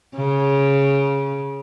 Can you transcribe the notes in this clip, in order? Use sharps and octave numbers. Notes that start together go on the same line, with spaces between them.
C#3